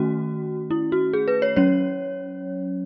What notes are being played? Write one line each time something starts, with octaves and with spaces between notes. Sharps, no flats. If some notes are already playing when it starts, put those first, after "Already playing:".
Already playing: D#3 A3 C#4 F#4
E4
F#4
G#4
B4
C#5
F#3 C#4 C#5